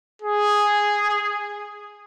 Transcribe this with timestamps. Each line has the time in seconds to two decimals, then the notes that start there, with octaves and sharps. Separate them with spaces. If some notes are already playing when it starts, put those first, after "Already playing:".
0.22 G#4